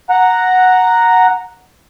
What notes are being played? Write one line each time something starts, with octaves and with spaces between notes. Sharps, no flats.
F#5 A#5